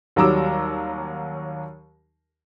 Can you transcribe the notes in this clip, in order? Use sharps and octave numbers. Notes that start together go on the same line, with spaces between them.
D#2 F#3 G3 A#5 D6 E6